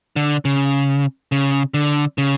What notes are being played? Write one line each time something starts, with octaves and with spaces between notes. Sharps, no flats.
D3
C#3
C#3
D3
C#3